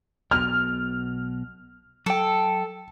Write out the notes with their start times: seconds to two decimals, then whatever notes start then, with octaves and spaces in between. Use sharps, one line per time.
0.31 B1 B2 F6
2.06 F#3 A4 G5